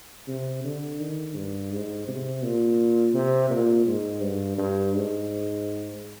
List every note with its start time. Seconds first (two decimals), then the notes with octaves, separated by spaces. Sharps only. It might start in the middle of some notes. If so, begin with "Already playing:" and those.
0.28 C3
0.64 D3
1.00 D#3
1.35 G2
1.71 G#2
2.08 C3
2.43 A#2
3.14 C3
3.50 A#2
3.87 G#2
4.22 G2
4.58 G2
4.93 G#2